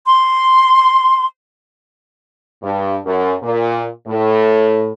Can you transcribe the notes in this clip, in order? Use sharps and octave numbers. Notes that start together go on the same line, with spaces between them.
C6
G2
F#2
A#2
A2